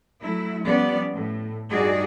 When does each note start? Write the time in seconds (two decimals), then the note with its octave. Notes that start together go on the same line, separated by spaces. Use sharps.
0.22 F#3 A3 E4
0.64 F3 G3 B3 C#4 D5
1.14 A2
1.71 G2 G3 D#4 F#4 G#4 D5